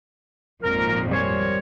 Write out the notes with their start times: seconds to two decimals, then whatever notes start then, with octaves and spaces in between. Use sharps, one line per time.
0.62 G#1 F2 A#2 A#4
1.11 G3 A#4 C5 C#5 G#5